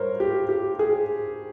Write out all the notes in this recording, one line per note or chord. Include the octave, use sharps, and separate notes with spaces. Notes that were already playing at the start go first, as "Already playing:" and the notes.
Already playing: G2 A#4 C5 C#5
G4
G4
G#4